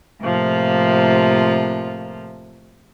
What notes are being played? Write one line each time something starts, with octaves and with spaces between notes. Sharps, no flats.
A2 C3 F3 A#3 F4